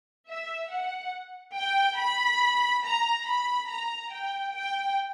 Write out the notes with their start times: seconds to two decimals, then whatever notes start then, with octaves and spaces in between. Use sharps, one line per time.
0.29 E5
0.71 F#5
1.57 G5
1.99 B5
2.85 A#5
3.26 B5
3.70 A#5
4.12 G5
4.54 G5